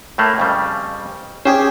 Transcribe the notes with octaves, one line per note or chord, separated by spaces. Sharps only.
A2 A3 A#3
F2 C#3 G3
C#4 G4 G#4 C5